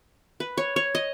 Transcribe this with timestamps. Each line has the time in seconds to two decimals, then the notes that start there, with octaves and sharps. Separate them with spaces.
0.40 B4
0.57 C#5
0.76 C#5
0.95 D#5